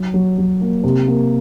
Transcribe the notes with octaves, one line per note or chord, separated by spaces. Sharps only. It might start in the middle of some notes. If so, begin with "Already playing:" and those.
Already playing: F#3
F#3
F#3
A#3
C3
A#3